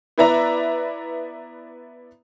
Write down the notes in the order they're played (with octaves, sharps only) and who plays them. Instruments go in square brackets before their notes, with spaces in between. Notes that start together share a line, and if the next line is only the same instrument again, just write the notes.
[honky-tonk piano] B3 E4 B4 D5 E5 A#5